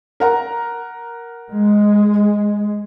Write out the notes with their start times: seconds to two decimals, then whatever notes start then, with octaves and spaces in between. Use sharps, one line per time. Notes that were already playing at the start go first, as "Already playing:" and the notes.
0.20 A#4 F#5 A#5
1.51 G#3